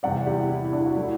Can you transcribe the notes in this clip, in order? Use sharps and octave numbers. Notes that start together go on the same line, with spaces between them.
E2 C3 G3 D5 F#5
E4 G4
E4
E4
D4
F#4
F#3 A3 E4